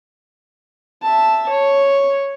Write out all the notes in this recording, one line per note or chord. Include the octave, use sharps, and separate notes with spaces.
E5 A5
C#5